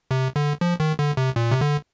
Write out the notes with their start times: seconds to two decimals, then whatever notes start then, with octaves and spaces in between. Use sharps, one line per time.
0.11 C3
0.36 D3
0.61 F3
0.80 D#3
0.99 D3
1.17 C3
1.36 A#2
1.51 C3
1.61 D3